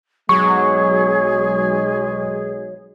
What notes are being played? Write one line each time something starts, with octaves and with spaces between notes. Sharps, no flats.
B1 F#3 G#3 G#4 C#6